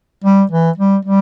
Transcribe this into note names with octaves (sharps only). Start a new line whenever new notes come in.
G3
E3
G3
G3